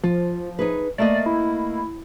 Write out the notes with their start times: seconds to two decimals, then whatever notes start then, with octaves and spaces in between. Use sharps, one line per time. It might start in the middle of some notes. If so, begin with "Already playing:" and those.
0.04 F3 F4
0.59 D#4 G#4 B4
0.98 A3 A#3 D5 D#5
1.26 E4